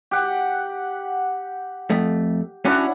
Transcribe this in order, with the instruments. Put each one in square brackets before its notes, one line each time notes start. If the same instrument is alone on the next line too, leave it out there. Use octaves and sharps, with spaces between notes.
[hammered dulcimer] G4 F#5
[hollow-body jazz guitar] F2 A3
[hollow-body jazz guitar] C#4 F#4 [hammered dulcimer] D4 E4 F#5